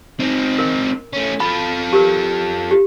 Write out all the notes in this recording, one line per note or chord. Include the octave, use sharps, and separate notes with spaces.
C4 D#4
A#4
A3 C#4
F4 A4 B5
G4 A#4
G4